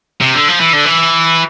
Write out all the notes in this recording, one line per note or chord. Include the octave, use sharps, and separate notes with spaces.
C3
D3
F3
E3
D3
E3